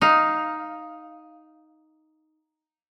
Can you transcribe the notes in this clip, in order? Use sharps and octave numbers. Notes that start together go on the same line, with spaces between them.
D#4 F5